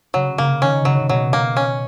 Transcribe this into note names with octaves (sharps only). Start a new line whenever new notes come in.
C#3 F#3
C#3 A#3
D#3 C#4
C#3 F#3
C#3
B2 F#3
A#3
C#4